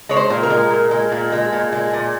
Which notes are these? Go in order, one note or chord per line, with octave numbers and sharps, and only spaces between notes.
G#3 C#5
C5
A#2
A#4
G#3
A#2
G#3
A#2
G#3
A#2
G#3
A#2